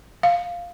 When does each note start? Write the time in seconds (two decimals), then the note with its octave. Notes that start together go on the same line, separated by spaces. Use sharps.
0.23 F5